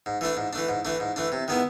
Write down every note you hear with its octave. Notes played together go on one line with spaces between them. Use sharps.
G#2
E3 A3 D4
G#2
E3 A3 D4
G#2
E3 A3 D4
G#2
E3 A3 D4
C3
D#3 G#3 B3 E4